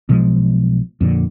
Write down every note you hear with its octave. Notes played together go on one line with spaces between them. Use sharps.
B1 B2 F3 G#3
F2 A#2 D3